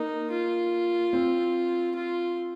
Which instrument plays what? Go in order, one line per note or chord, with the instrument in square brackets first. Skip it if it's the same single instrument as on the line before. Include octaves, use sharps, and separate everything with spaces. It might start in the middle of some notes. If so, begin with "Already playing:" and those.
Already playing: [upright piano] A#3 [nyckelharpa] D#4
[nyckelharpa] F4
[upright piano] C4
[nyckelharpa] F4